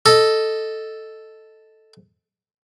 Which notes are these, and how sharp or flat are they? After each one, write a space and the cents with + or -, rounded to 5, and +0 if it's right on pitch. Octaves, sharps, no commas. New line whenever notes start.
A4 +0 D#5 +0